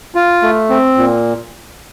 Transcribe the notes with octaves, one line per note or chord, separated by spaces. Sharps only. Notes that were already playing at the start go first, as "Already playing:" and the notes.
F4
A3
C4
A#2